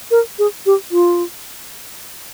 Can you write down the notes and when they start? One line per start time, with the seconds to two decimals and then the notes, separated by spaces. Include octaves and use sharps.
0.11 A#4
0.39 G#4
0.66 G4
0.91 F4